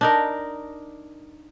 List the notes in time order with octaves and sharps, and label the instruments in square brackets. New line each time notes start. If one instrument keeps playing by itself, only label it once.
[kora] D4 D#4 A#4